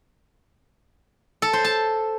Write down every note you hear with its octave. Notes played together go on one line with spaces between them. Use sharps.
A4
C5
A5